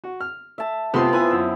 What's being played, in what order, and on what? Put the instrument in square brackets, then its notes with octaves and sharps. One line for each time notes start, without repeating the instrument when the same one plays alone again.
[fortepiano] F#4
F6
[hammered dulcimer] E5 A5
[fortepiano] C3 A3 C6 [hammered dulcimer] B3 C4 [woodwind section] F4
[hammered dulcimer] E4 [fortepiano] B4 G#5
[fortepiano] F#2 E6